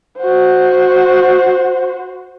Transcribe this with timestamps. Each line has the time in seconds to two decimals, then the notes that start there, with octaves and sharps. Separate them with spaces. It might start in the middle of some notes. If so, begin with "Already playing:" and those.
0.18 F#4 C5